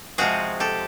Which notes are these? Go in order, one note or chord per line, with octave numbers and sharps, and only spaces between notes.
C3 F3 G#3 C4 F#4 G#4
G4 A4